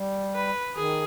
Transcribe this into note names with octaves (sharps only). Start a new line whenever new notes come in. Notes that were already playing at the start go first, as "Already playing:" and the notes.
Already playing: G3
B4
D#3 G#4